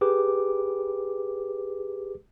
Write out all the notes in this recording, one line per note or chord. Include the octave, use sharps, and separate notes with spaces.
G4 G#4 B4 D6